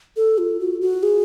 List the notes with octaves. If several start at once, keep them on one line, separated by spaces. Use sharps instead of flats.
A4
F4
F#4
F#4
G#4